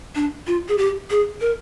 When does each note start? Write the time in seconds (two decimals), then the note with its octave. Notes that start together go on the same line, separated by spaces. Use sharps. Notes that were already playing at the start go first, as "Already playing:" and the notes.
0.15 D4
0.47 F4
0.69 G#4
0.78 G4
1.10 G#4
1.41 A#4